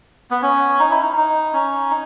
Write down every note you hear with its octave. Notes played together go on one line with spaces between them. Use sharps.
B3
C#4
D#4
E4
D#4
D#4
C#4
D#4